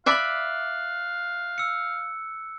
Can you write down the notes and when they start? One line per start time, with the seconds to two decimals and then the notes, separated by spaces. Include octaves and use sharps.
0.06 D5 E5 F5 B5 F#6 A6 F#7
1.58 E6 C#7